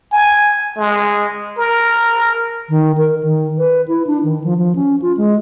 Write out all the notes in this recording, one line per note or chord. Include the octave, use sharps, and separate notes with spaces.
G#5
G#3
A#4
D#3
A#4
D#3
B4
E4
D4
D#3
F3
F3
C#4
F4
G#3